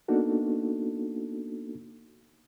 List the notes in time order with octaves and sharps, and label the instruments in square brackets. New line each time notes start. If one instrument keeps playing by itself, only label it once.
[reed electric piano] A#3 B3 D4 D#4 F#4 A4